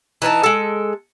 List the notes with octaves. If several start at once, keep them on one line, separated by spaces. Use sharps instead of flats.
E3 D#4 E4 A5
G#3 A4